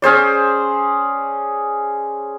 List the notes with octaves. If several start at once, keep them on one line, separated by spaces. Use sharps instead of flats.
C#4 G#4 C5 D5